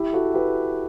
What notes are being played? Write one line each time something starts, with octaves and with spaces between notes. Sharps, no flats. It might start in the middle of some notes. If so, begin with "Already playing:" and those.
Already playing: E4 G4
F#4 A4
G4 B4